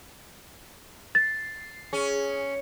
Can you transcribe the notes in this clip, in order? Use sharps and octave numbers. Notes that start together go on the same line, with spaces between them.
A6 C7
C#4 G#4